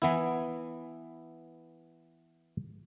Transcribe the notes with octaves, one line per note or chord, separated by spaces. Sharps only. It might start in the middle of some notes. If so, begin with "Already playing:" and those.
E3 B3 E4